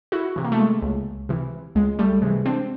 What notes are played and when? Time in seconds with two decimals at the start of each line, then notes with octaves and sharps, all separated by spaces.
0.12 E4 F#4
0.36 C3 E3
0.44 A#3
0.52 A3
0.59 G#3
0.82 C#2
1.29 C3 E3
1.75 C#2 G#3
1.99 G3 A3
2.22 C3 E3 G#3
2.46 C4 D4